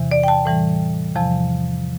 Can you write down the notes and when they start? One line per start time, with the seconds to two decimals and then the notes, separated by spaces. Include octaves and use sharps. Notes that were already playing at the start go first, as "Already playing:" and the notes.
Already playing: E2 C3 E3
0.12 D5
0.23 G5
0.28 A5
0.45 A2 E3 G3
1.15 E2 C3 F3 A5